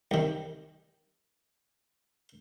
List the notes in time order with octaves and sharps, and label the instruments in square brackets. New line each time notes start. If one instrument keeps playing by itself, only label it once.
[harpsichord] C2 D#3